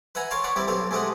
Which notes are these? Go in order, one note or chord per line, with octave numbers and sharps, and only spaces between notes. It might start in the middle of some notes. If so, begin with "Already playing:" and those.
B4 E5 F#5 G#5 A#5
A#4 C#5 F5 A5 C6
D5 F5 F#5 B5 C#6
G3 C4 E4 D5
B1 C4 A4 F5
G#3 A3 C4 G4 D#5 F#5